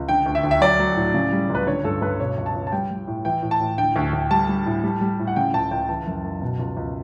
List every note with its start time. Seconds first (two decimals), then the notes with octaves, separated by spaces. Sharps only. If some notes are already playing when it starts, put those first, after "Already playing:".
Already playing: C#2
0.09 D3 G5
0.26 D2
0.35 E5
0.44 D2
0.51 E5
0.61 F#3 D5
0.80 F#3
0.97 A2
1.14 C#3
1.32 G3
1.50 C#2 B4
1.67 D3 C#5
1.85 G2 A4
2.02 G2 B4
2.20 B2 C#5
2.38 C#2
2.46 A5
2.55 C#2
2.67 A5
2.72 G3 G5
2.91 G3
3.07 A2
3.25 E3 G5
3.42 A2
3.51 A5
3.61 A2
3.78 D3 G5
3.96 D2
4.13 D2
4.31 G3 A5
4.49 G3
4.66 A2
4.84 G3
5.01 G3
5.19 A2
5.27 F#5
5.36 C#3 G5
5.54 C#2 A5
5.71 C#2 G5
5.89 E3 A5
6.07 F#2
6.24 F#2
6.42 B2
6.59 C#2
6.77 C#2